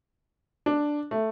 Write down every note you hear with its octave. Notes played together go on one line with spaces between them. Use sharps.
D4
A3